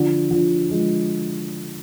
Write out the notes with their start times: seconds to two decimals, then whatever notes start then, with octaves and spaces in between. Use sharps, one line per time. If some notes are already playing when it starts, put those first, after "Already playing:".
Already playing: D3 F3
0.31 D3 F3
0.70 F3 G#3